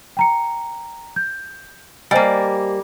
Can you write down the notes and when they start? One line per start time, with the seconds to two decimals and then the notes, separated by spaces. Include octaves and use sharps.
0.17 G5 A#5 C#7
1.16 G6
2.11 G3 A#3 C5 D#5 G#5